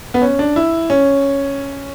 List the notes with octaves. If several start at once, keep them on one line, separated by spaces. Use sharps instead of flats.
B3
C#4
D4
E4
C#4